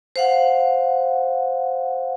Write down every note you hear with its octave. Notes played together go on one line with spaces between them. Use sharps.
C5 F5 F#5